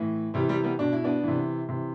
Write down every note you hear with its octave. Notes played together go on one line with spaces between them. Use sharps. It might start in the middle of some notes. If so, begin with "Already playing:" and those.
Already playing: A2 E3
C3 E3 G3
G3
G3 B3
B2 D4
E4
B3 D4
C3 E3
C3 E3